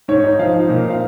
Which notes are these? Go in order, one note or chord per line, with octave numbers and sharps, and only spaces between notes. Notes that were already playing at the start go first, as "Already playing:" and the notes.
G#2 C#5
D#4 C#5
F3 F5
D#4
A#2
C4 F5